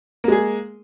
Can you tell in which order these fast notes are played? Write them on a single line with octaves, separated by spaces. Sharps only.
A#3 G#3 G#4